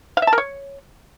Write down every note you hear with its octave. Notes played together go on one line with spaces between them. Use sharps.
F5
E5
A5
A#4
C#5